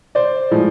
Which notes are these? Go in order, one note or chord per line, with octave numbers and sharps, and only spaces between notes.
C5 D5
A2 F3 G#3